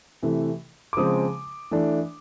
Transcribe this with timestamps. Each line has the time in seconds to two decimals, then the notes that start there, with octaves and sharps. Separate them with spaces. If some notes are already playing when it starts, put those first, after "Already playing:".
0.23 C3 E3 A3
0.93 D6
0.97 C#3 F3 G#3 C4 D#6
1.71 E3 A3 D4